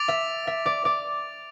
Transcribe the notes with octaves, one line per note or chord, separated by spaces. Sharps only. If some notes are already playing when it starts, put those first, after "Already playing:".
Already playing: D6 A6 D7 F7
E5
E5
D5
D5